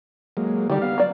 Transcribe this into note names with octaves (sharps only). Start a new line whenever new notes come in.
F#3 G#3 A#3
D3 D#3 G3 D#4 G4
B3 F5
F#3 D5